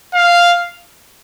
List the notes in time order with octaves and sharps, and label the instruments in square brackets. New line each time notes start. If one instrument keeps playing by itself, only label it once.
[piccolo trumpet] F5